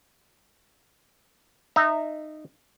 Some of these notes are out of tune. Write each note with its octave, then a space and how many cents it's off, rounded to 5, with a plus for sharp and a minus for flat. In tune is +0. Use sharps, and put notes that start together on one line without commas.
D#4 -15 E5 +0 A#5 +0